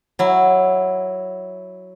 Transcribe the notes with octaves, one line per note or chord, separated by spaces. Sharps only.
F#3 E4